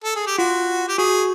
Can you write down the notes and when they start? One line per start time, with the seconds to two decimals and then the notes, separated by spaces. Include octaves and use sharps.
0.04 A4
0.16 G#4
0.27 G4
0.38 F4 F#4
0.88 G4
0.98 F#4 G#4